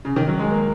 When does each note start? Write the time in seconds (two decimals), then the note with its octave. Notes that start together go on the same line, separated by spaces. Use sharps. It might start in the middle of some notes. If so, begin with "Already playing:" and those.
0.05 C#3
0.16 D#3
0.28 F#3
0.39 G#3
0.51 A#3